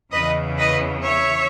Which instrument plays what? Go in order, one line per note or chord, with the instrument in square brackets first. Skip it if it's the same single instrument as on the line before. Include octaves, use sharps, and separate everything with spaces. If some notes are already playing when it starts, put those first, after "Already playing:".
[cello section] E2 C#3 E3 B4 D#5
B4 D#5
C#5 E5